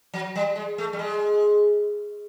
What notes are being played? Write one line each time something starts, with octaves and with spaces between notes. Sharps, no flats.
F#3
G3
G#3
A3
G3
G#3